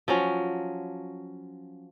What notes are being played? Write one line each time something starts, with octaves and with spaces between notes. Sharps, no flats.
F3 F#3 C#4